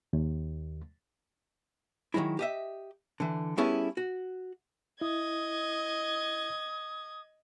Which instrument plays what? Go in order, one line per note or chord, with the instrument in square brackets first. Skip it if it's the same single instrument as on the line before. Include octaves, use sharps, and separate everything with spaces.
[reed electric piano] D#2
[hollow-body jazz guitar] D#3 E3 F#3 G#3 E4
G4 D#5 E5
D3 E3
G3 B3 C#4 E4 G#4 A4
F#4
[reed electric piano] E4 [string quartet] D#5 G#6 [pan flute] D#6